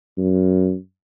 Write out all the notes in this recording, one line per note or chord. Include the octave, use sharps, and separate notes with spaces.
F#2